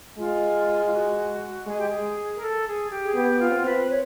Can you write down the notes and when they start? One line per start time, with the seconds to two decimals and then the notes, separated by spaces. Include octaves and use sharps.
0.17 G#3 F4
0.85 F4
0.92 F#4
1.66 G#3 G#4
1.78 G4
1.88 G#4
2.35 A#4
2.41 A4
2.66 G#4
2.90 G4
3.03 G#4
3.14 B3 G4
3.39 F4
3.51 C4
3.64 B4
3.89 C#5